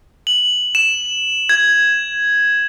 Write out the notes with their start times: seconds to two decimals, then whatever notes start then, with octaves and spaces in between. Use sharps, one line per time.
0.27 F#7
0.75 E7
1.49 G#6